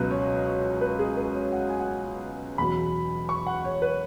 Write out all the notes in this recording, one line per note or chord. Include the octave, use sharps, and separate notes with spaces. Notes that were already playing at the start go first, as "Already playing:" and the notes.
Already playing: C#2 B2 F#3 B4
C#5
C#5
B4
G#4
B4
C#5
F#5
G#5
F#5
G#5
E2 B2 F#3 B5
C#6
F#5
C#5
B4